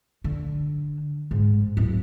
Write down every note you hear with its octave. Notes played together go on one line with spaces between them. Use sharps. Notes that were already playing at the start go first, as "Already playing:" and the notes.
D3
G#2
D1